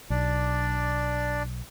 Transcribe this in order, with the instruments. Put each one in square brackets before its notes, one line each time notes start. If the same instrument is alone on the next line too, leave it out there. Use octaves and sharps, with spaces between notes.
[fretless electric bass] B1 [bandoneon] D4 D5